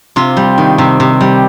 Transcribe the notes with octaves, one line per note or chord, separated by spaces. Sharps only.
C3 F4
G3
D#3
C3
C3
G3